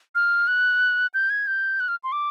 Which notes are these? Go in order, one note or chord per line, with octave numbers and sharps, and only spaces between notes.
F6
F#6
G6
G#6
G6
F#6
F6
C6
D6